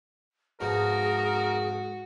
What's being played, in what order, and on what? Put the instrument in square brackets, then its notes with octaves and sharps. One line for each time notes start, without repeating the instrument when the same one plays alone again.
[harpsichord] F2 G#2 B2 [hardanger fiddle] F#4 [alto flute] G#4 [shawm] A#4